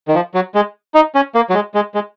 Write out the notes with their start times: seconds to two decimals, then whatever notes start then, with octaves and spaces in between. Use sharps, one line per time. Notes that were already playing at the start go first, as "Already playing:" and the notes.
0.08 D#3
0.15 F3
0.34 F#3
0.55 G#3
0.95 D#4
1.15 C#4
1.35 A#3
1.50 F#3
1.54 G#3
1.75 G#3
1.95 G#3